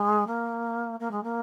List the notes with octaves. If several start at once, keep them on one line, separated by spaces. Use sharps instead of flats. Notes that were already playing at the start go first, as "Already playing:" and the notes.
Already playing: G#3
A#3
A#3
G#3
A#3